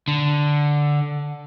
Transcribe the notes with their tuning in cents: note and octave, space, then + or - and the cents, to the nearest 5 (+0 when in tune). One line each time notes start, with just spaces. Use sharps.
D3 +0